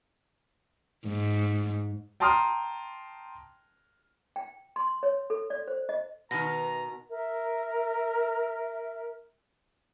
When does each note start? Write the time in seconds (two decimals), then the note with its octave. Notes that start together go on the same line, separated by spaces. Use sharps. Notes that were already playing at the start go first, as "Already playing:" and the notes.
1.06 G#2
2.20 G5 A5 A#5 C6 D#6 F6
4.36 G5
4.76 C6
5.03 C#5
5.30 A4
5.50 D5
5.68 C5
5.89 D#5
6.31 B2 D#3 B4 A#5 A#6
7.10 A#4 E5